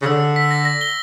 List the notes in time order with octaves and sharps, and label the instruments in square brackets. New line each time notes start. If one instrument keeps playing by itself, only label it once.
[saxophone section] C#3
[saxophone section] D3 [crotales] E6
[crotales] E6
B6
A#6
A#6
G7